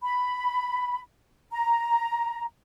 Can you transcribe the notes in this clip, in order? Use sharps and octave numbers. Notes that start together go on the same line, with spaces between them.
B5
A#5